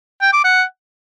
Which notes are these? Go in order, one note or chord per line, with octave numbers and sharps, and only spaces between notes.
G5
D6
F#5